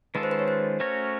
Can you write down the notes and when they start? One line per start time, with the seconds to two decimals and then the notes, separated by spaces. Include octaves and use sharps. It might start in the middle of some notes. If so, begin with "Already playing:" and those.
0.15 D#3 G#3 C#4 F4 A4 B4
0.23 C5
0.31 B4
0.39 C#5
0.48 C5
0.80 A3 C#4 F#4 A#4 C#5